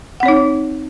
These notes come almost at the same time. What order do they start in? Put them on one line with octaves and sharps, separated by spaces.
F#5 C4 C#5 D#4